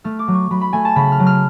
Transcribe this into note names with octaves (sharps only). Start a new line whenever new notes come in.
A3 F6
D6
F#3
C#6
F#3 B5
B5
A3 G#5
A5
C#3 B5
F6
F#3
F6